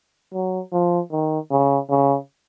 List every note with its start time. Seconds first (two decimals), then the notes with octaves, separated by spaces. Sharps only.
0.33 F#3
0.72 F3
1.11 D#3
1.51 C#3
1.90 C#3